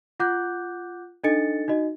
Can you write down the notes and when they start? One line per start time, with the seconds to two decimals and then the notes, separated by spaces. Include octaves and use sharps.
0.20 F4 F#5 D6 F#6 G6
1.24 D4 D#4 A4 D#5 A6 C#7
1.68 D#4 F#4 D#5